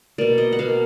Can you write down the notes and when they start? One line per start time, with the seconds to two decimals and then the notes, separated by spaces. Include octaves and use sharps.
0.18 B2 A#3 D5
0.38 D#5
0.52 F#5
0.59 B2 A#3 F5